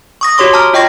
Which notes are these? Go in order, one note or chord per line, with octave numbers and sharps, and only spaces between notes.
C#6 D#6 A#6
F#4 G4 C#5 C6 D6
A5 A#5 D6 F6
F4 D#5 G5 C#6 A#6